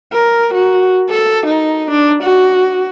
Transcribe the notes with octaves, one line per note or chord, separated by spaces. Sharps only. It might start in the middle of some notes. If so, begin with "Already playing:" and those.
A#4
F#4
A4
D#4
D4
F#4